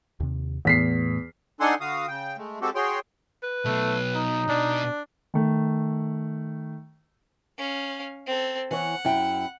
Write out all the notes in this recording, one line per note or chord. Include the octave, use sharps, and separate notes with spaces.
D#2 C3
E2 A2 A3 B3 B6 C7
D4 D#4 A4 F#5 G#5 C6
D3 F#4 F5 D#6
C#3 G5
G#3 A3
G#3 C4 F#4 G4 A4
F#4 G#4 C#5 G5 C6
B4
B2 F#3 A3
D#4
B2 D4
D#3 A3
C#4 F5
C4 A4
E3 C#5 F#5
F#2 E4 G5